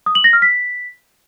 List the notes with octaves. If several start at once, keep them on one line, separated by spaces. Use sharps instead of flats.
D#6
F#7
A#6
F6
B6